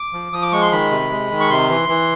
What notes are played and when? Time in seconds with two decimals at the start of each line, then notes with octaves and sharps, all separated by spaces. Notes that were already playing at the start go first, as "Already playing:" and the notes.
Already playing: D6
0.13 F3
0.33 F3 D#6
0.42 D6
0.52 G#3 C#6
0.62 C6
0.72 D#3 B5
0.91 C3
1.10 G#3
1.31 D#3
1.41 C#6
1.50 C3 C6
1.69 E3
1.89 E3